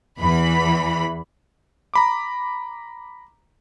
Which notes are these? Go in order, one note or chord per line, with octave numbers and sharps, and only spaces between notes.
E2 E3 B5
A#5 B5 D6